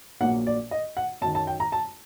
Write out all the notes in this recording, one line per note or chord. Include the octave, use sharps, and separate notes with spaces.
A#1 A#2 F#3 A#3 F#5
D5
D#5
F#5
F#2 D#3 F#3 A5
A5
G5
A#5
A5